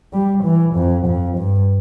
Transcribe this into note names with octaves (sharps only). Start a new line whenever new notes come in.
G3
E3
F2
F2
G2